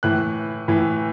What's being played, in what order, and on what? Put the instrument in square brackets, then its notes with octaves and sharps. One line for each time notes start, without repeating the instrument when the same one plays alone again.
[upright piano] A2 E3 F#6
A2 E3